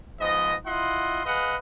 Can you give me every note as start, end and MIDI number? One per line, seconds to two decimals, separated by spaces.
0.20 0.55 44
0.20 0.55 53
0.20 0.55 59
0.20 0.55 75
0.66 1.23 64
0.66 1.23 65
0.66 1.23 75
0.66 1.23 78
0.66 1.23 84
1.25 1.56 68
1.25 1.56 71
1.25 1.56 75
1.25 1.56 77
1.25 1.56 78